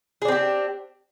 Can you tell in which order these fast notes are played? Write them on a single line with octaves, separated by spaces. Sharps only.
G#4 D4 C4 G4